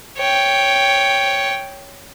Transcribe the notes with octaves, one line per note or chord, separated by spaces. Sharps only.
C#5 G5